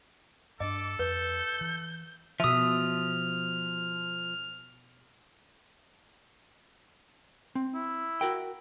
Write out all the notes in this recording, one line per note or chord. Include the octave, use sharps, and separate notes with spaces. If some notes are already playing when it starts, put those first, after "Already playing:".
G2 C#4 D4 A4 D#5 D6
F2 B4 G6
E3
B2 F3 E5 D#6 F6
C4
E4
F#4 A#4 G5